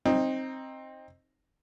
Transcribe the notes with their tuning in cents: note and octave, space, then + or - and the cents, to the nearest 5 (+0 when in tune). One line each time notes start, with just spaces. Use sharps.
C4 +15 D#4 +0